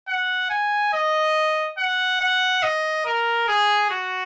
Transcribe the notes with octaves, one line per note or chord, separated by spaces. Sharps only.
F#5
G#5
D#5
F#5
F#5
D#5
A#4
G#4
F#4